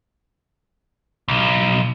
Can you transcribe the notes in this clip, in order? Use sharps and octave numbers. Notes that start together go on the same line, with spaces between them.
B1